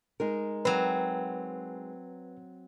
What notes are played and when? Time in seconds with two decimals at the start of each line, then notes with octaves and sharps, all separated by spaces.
0.20 G#3 D#4 A#4
0.65 F#3 C4 B4